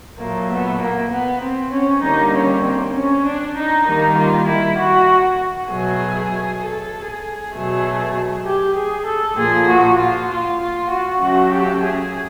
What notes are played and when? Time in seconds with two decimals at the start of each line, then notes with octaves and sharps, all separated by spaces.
0.19 A#2 F#3 A3 A#3
0.50 B3
0.80 A#3
1.11 B3
1.42 C4
1.72 C#4
2.03 D3 G3 A#3 D#4
2.34 C#4
2.64 C4
2.94 C#4
3.26 D4
3.56 D#4
3.86 D#3 G3 A#3 D#4
4.17 F4
4.48 E4
4.78 F#4
5.70 B2 F#3 A3 G#4
6.62 A4
7.07 G#4
7.54 B2 F#3 A3
8.45 G4
8.76 G#4
9.07 A4
9.37 A#2 F3 A#3 G#4
9.68 F#4
9.98 F4
10.29 F4
10.60 F4
10.90 F#4
11.20 C#3 F#3 A3 F#4
11.52 G4
11.82 G#4